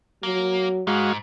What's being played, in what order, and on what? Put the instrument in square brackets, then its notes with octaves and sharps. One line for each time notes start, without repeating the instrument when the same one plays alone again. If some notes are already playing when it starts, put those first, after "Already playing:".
[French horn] F#3 [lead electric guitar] A#3
[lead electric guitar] G#2 [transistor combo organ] G#3 F#4 F5